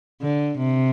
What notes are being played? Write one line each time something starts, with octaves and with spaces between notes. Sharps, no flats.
D3
C3